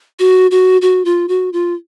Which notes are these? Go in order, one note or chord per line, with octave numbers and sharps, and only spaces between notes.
F#4
F#4
F#4
F4
F#4
F4